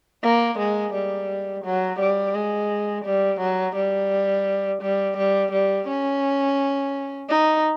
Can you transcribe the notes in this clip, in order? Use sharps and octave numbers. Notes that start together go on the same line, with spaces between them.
A#3
G#3
G3
F#3
G3
G#3
G3
F#3
G3
G3
G3
G3
C#4
D#4